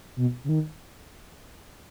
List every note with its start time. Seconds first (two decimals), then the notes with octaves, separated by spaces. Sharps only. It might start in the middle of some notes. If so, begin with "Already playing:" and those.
0.16 B2
0.44 C#3
0.49 D#3